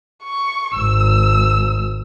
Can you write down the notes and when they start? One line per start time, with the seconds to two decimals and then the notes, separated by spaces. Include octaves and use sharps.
0.24 C#6
0.75 G#1 E6